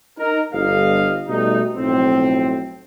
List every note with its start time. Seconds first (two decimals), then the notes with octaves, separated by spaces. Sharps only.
0.18 D#4 A#4
0.52 G1 G2 A4 D#5 F5
1.28 B2 G3 A3 D#4
1.76 B1 F2 A2 C4